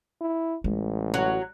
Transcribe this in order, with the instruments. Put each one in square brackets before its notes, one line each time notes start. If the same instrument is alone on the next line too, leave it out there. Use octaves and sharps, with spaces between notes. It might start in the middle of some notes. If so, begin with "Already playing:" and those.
[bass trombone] E4
[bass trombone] A1 [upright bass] G#3
[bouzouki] F#3